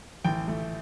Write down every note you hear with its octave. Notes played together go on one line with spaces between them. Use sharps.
A1 G5
A3